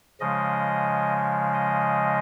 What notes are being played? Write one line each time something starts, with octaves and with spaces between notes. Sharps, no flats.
C#3 F3 G#3 D#5
D#5